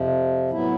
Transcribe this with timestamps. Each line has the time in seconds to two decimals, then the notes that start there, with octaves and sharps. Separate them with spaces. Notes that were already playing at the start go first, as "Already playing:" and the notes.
Already playing: F2 C3 F3
0.51 A2 F#3 B3 E4